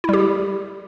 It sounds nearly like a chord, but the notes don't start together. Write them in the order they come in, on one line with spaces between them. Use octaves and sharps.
E4 G3 G4